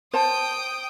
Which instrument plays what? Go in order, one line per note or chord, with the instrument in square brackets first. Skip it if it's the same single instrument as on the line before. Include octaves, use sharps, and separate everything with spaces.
[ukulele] C5 A5 [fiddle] G5 D#6